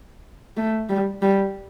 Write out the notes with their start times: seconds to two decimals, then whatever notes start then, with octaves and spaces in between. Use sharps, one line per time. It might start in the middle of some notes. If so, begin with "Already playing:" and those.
0.57 A3
0.89 G3
1.22 G3